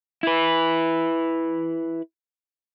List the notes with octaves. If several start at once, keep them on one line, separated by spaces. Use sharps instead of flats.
E4 B4